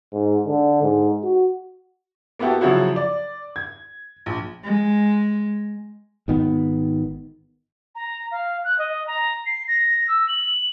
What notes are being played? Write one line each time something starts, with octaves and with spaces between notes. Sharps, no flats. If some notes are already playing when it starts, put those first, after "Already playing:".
G#2
D3
G#2
F#4
A#3 B3 E4 F#4 G4 A4
C#3 F3 F#3 E4 F#4
D5
G#6
A#1
G#3
G#1 D#3 B3
A#5
F5
F#6
D#5
A#5
C7
A#6
E6
F#7